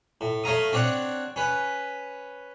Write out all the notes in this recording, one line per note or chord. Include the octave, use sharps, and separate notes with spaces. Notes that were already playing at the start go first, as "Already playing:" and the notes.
A2
A3 C#5 F5 A#5 D#6
C4 D4 C#5 D5 F#5
C#4 B4